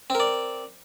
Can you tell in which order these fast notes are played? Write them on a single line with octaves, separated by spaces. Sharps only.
C4 A#4 D5